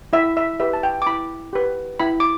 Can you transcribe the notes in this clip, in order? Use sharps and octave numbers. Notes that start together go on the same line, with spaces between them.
E4 E5
E5
G4 B4 E5
A5
G5
D6
E4 B5
G4 B4
E4 B5
D6